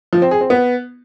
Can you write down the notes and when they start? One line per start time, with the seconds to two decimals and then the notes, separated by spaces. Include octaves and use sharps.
0.13 F3
0.22 C4
0.31 G#4
0.41 C4
0.50 B3